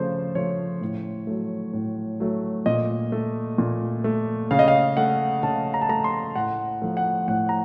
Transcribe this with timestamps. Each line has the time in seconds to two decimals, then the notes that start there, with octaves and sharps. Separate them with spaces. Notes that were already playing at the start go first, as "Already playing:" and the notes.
Already playing: C#3 F3 A3 C5
0.35 F3 A3 C#5
0.81 A2
1.27 F#3 A3
1.74 A2
2.20 F#3 A3
2.66 A#2 D#5
3.12 A3
3.58 A#2
4.04 A3
4.51 C#3 F5
4.59 D#5
4.68 F5
4.97 A3 F#5
5.43 C#3 A5
5.74 A#5
5.82 A5
5.89 A3 A#5
6.04 C6
6.36 A2 F#5
6.82 F3 A3
6.97 F#5
7.28 A2 F#5
7.49 A#5